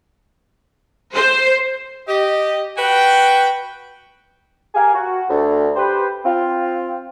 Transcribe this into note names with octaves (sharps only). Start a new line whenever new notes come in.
C5
G4 D#5
F#4 B4 G5
G4 A#4 F5 G#5
F#4
D2
G4 B4 C5
C4 F4